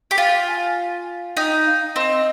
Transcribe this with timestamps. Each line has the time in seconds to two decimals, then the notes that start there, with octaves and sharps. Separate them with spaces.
0.11 G4
0.18 F4 G5
0.47 G#5
1.36 D#4 G5
1.65 F5
1.95 C4 D#5